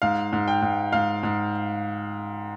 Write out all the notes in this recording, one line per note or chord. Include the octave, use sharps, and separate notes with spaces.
G#2 F5
G#2
G5
G#2
G#2 F5
G#2